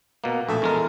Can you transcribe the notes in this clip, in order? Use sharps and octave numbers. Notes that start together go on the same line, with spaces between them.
B2 A#3
A#1 A3
E2 G#3 A#4